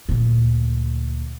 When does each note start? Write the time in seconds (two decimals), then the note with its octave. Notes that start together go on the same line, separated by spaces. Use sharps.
0.09 D2 A#2